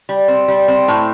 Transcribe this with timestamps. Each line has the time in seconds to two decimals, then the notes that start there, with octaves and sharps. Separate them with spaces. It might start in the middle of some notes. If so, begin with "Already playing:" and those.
0.09 G3
0.28 C4
0.48 G3
0.68 C4
0.88 A2